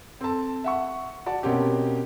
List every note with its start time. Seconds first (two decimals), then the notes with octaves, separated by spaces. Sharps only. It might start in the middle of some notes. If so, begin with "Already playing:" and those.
0.21 C4 A4 A5
0.64 E5 F#5 C#6
1.26 F#4 D5 A5
1.43 B2 A#3 C4 C#4 G4